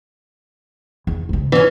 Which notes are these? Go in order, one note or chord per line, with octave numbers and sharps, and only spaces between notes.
E2
G#2 C#3
E3 C#4